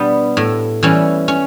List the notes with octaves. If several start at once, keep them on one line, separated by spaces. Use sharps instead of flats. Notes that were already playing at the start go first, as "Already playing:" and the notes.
Already playing: B2 G3 B3 D4
A2
E3 G3 C#4
C#4